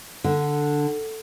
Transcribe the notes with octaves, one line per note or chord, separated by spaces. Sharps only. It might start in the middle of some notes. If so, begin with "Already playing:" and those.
D3